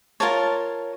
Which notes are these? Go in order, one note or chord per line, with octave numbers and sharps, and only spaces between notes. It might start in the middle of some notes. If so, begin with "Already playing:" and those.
F4 A#4 C#5 A5